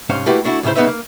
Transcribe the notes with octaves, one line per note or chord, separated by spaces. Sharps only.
C2 G#2 C#4 C5 F5
A3 A#3 E4 F#4 G4 B4
A3 D4 E4 F#4
C#2 A2 C#3 E4 C5
B1 C#3 B3 D#4 B4 E5
A#3